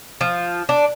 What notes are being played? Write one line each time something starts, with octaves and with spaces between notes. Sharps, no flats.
F3
D4